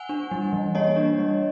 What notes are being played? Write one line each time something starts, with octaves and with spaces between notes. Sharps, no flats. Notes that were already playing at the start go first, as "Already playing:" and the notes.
Already playing: F#5 G#5
D4
G3
E3
A#3 C#5 D#5
D4
G3